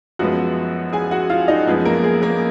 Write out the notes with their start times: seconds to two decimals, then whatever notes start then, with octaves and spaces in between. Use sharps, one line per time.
0.19 F#2 F3 G#3 B3 F#4 F#5
0.93 G#4 G#5
1.11 F#4 F#5
1.30 F4 F5
1.48 D#4 D#5
1.67 F#2 F3 G#3 B3 G#4
1.85 A#3 A#4
2.04 G#4
2.22 A#3 A#4